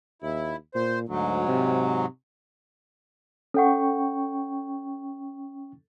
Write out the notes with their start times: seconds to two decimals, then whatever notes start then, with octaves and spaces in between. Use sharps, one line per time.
0.22 D#2 E4
0.75 A#2 C5
1.09 D2 G#2 F#3
1.48 C3
3.54 C#4 A4 F#5 G5 C#6